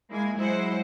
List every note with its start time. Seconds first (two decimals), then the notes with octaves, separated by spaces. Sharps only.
0.10 G#3 A#3 E4 G#5
0.39 F#3 G#3 E4 C5 F#5